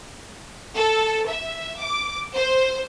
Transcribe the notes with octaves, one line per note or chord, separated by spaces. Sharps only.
A4
E5
D6
C5